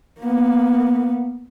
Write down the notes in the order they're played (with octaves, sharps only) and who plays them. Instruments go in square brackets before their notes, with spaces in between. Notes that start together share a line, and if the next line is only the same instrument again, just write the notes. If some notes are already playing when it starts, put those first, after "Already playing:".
[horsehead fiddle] A#3 B3